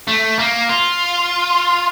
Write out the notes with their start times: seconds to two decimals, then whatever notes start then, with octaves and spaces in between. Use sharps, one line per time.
0.07 A3
0.38 A#3
0.70 F4